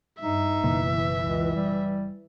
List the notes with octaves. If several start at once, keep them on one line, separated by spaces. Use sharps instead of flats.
G2 D#4 E5
F#1 B2 E3 A#3
C#2
G3